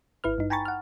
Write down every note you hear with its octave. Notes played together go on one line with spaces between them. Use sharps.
G#1 E4 B4 F6
G2 D#4
G5 G#5 A#5 B5 C#6 A6
F#5 F6